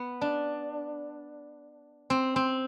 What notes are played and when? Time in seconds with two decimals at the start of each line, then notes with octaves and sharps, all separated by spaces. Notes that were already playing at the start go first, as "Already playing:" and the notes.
Already playing: B3
0.21 D4
2.10 C4
2.36 C4